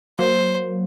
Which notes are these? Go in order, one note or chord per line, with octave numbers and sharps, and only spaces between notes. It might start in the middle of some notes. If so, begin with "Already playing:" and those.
F#3 A#3 C5